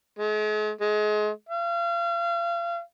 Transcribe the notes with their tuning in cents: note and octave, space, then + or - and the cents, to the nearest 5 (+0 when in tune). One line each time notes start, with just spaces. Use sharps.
G#3 +40
G#3 +30
F5 -35